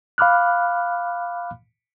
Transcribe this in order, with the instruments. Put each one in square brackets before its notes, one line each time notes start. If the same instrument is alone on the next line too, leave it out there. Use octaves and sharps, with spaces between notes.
[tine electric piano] F5 B5 D6 F6 F#6